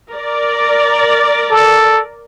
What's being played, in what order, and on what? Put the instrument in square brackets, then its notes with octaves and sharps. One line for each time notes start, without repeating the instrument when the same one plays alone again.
[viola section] A#4 D5
[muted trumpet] A4